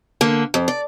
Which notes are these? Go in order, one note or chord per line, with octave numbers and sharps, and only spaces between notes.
D3 A#3
F2
D5